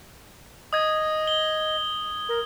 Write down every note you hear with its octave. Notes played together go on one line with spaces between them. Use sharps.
D#5 D#6 G#6
G7
A#4